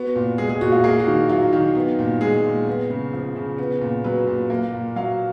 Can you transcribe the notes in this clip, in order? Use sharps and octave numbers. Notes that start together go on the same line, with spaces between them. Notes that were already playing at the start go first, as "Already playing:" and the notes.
Already playing: B3 F#4
A#2
G#3 G#4
G#4
A#2 F#4
F4
A#3 G#4
F#4
D#3
F#3 F4
D#3
B3
A#2
G#3 G#4
A#2
B3
C#3
F3
C#3
B3
A#2
F#3 B4
A#2
A#3
A#2
F#3 F5